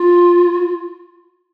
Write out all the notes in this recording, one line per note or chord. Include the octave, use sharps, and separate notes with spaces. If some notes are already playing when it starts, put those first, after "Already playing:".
Already playing: F4